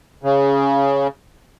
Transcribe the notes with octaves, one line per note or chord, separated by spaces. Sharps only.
C#3